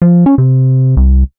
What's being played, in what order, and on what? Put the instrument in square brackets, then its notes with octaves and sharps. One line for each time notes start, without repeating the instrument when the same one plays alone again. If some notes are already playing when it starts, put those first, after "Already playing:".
[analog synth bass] F3
C#4
C3
C2